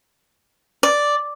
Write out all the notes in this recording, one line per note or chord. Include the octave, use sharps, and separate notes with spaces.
D5